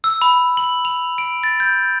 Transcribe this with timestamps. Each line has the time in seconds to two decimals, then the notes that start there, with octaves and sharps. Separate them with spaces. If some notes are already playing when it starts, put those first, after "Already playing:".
0.04 E6
0.22 B5
0.57 F#7
0.85 F7
1.18 D7
1.44 A6
1.60 G6